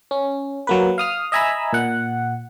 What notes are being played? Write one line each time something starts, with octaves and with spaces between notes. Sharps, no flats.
C#4
F#3 A#3 B4
F5 D#6 F6
D#5 E5 G#5 A#5 B5 E6
A#2 F#5